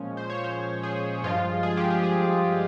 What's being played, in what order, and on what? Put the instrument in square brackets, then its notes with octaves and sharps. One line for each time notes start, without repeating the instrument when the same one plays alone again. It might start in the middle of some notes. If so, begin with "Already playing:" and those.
Already playing: [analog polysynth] A#2 F3 G#3 C#4
C5
C#5
C5
G#4
G2 F3 G#3 F4
G#4
G4
G#4
G#4